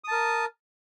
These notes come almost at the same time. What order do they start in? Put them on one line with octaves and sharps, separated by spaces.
D#6 A5 A#4